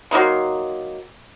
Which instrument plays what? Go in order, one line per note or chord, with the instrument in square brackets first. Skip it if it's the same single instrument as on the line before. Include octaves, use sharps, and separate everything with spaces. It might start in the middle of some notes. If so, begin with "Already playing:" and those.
[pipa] F#3 A#3 D#4 C6